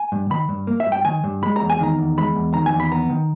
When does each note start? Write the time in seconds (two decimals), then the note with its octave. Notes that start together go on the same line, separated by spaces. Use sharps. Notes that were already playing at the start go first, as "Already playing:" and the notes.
Already playing: G#5
0.12 G2
0.30 D#3 B5
0.49 G2
0.67 A#3
0.80 E5
0.86 G2
0.92 G5
1.05 D#3 G#5
1.24 G2
1.43 G#3 B5
1.56 A#5
1.62 E2
1.70 G#5
1.80 D#3 A#5
1.98 E2
2.17 G#3 B5
2.36 E2
2.54 D#3 A#5
2.66 G#5
2.73 E2
2.80 B5
2.92 B3 A#5
3.10 D#3